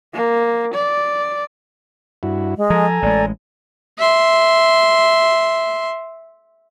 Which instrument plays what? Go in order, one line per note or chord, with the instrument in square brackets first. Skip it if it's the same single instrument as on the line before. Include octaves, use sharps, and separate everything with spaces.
[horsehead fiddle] A#3
D5
[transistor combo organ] G2 E4 F#4
[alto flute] G#3
[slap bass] F3 [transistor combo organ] A4 G#5 A#5
[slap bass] A1 G#3 [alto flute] D5
[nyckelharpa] E5 C6